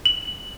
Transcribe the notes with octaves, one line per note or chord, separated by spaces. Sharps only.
F#7